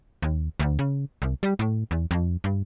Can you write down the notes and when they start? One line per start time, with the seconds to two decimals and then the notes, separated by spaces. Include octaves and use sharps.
0.22 D#2
0.60 D2
0.79 C#3
1.22 C2
1.43 G3
1.59 A2
1.91 E2
2.11 F2
2.44 G2